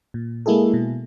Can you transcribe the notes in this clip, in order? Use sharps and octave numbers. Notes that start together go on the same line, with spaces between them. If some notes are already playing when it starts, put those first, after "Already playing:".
A#2
G#3 A#3 E4 G#4 A4
B2